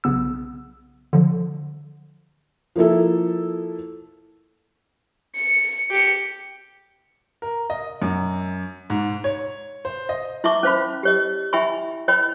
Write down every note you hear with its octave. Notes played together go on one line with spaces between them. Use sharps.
B1 C#3 B3 E6
D3 F3
F3 A#3 E4 A4
C#7
G4 C#7
A#4
D#5
F#2
G#2
C#5
C5
D#5
E4 E5 A5 C#6 D6
C#4 C5 F5 B5
G4 C#5 D#5
E4 E5 G5 G#5 B5 C#6
E4 C#5 D#5 G5 B5